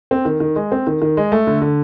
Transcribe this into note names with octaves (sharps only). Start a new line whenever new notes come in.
C4
D#3
D#3
G#3
C4
D#3
D#3
G#3
A3
D3
D3